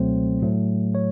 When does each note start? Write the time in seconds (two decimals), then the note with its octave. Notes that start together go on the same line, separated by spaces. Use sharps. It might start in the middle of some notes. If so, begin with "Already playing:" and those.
Already playing: C#2 B2 F#3 A3 C4 C5
0.42 A2 F#3 A3
0.95 C#5